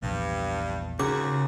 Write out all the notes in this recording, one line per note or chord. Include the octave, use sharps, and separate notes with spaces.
A#1 E2 G2
D#2 G#2 C#3 F#4 D6